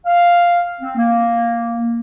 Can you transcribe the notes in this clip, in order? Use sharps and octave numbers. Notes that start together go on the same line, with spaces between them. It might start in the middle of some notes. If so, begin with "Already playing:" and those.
F5
C4
A#3